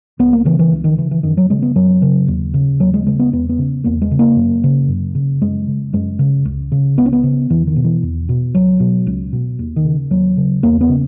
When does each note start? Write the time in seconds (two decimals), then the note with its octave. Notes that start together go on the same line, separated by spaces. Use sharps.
0.19 C#2 B3
0.33 A#3
0.45 C#3 E3
0.59 E3
0.72 C#2
0.84 D#3
0.97 C#3 E3
1.11 E3
1.23 F#2 D#3
1.37 F#3
1.50 C#3 G#3
1.62 B3
1.75 F#2 F#3
2.02 C#3
2.28 D#2
2.54 C#3
2.80 D#2 F#3
2.94 G#3
3.06 C#3 G#3
3.19 B3
3.32 E2 B3
3.49 B3
3.59 C#3
3.84 E2 A#3
4.02 G#3
4.11 C#3
4.19 A#3
4.36 F#2
4.64 C#3
4.89 F#2
5.15 C#3
5.42 F#2 G#3
5.67 C#3
5.93 F#2 G#3
6.19 C#3
6.45 C#2
6.72 C#3
6.97 C#2 B3
7.06 C#4
7.13 B3
7.23 C#3
7.50 E2 E3
7.67 D#3
7.76 B2
7.84 E3
8.03 E2
8.29 B2
8.55 C#2 F#3
8.80 B2
9.07 C#2
9.33 B2
9.59 D#2
9.76 D#3
9.85 C#3
10.10 D#2 F#3
10.37 C#3
10.63 E2 A#3
10.81 B3
10.89 C#3